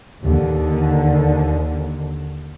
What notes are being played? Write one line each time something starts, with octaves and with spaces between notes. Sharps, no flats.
D#2 D3